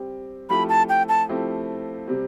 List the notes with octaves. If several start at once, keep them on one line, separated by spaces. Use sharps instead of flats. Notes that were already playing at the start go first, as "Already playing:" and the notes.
Already playing: G3 C4 G4
F3 A3 C4 E4 G4 B5
A5
G5
A5
F3 A3 C4 E4 G4
C3 G3 C4